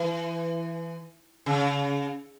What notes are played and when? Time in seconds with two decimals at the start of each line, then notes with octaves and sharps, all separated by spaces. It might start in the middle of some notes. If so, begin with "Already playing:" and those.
Already playing: E3
1.46 C#3